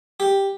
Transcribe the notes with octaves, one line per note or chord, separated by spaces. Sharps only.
G4